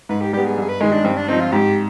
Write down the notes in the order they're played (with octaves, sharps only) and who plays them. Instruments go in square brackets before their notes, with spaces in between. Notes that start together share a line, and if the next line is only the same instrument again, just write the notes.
[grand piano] G#2 [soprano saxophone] B4
[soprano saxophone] G4
[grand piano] G3 B3 [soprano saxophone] G4
[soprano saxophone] G#4
[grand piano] G2 [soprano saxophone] G#4
[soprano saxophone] B4
[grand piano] D#3 G#3 [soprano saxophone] G#4
[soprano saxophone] D4
[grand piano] G2 [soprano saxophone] C4
[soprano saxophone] D4
[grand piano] F3 C4 [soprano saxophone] D#4
[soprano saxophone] F4
[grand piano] G#2 [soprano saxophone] G4